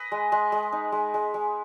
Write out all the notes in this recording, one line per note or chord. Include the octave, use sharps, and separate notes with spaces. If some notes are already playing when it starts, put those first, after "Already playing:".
Already playing: B4 D#5
G#3
G#3
G#3
D#4
G#3
G#3
G#3